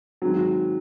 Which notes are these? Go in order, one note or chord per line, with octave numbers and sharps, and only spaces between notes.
G#2 D#3 F#3 G#3 C4